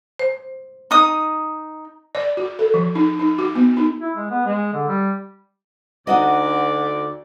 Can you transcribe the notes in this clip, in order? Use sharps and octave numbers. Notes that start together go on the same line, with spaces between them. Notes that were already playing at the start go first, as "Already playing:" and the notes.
C5
D#4 D#6
D5
F#4
A4
F3
D#4
D#4
F#4
B3
D#4
E4
G#3
B3
G#3
D3
G3
D2 D#4 F#4 D5 D#5